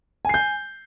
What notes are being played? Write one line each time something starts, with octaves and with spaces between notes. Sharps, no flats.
G#5 G6 C7